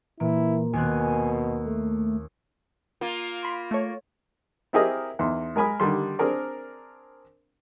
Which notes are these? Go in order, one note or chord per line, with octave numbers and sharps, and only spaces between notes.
A#2 E3 A#3 E4
D#2 B2 C4 G#5 F#6
A3
A#3 F4
B5 C6
A3 C#5
C4 E4 G4 G#4 A#4 D#5
E2 D#4 C6
G#3 A#4 G#5 B5 D#6
D3 D#3 G3 C6
C4 D4 G#4 A#4 D5